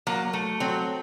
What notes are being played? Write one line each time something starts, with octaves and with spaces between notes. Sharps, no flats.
F#3 A#3
A3
F#3 C4